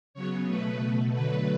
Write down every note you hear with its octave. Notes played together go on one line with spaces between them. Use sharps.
C#3 F#3 B3 C#5
B2 A3 B4
B2 A3
D3 F#3 A3 B4